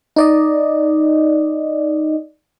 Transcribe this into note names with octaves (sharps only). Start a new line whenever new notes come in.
D#4 D5 D#5